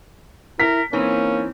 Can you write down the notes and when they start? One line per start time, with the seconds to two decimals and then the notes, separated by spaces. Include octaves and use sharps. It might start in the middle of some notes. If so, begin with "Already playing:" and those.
0.60 E4 A#4 B6
0.93 E3 A#3 C4 C#4 D#4